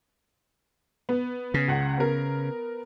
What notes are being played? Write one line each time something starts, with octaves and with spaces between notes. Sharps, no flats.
B3
C#3
C#2 F#5
B3 A#4